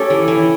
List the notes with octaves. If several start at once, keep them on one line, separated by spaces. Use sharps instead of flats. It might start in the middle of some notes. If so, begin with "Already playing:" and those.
Already playing: A3 C#4 G4 A4
E3
E3